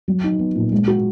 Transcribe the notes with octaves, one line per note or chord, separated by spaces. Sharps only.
F#3
D#4
B3
A#2
G#3
F#4